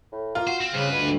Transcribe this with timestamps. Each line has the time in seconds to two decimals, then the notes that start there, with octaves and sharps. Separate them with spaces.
0.12 A2
0.35 A#3 F4
0.47 F#4 C5
0.61 C4
0.73 G2 C#3 C4 B4
0.92 D2 B2